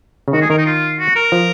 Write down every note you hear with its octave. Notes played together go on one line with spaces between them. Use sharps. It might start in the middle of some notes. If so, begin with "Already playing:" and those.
C#3
D#3 F#4
G#4
D#3 A#4
D#4
F4
F#4
A#4
F3